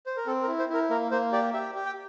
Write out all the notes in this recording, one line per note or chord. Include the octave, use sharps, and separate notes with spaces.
C5
A#4
C4 A4
A#4
E4
C5
E4 A#4
A#3 A#4
A#3 C5
G4 D5
G4 E5
G4
G5